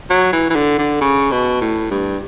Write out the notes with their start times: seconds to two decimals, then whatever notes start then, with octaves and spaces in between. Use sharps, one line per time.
0.10 F#3
0.33 E3
0.50 E3
0.55 D3
0.78 D3
1.01 C#3
1.31 B2
1.61 A2
1.91 G2